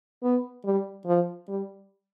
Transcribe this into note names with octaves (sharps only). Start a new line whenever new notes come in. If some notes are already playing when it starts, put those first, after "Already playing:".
B3
G3
F3
G3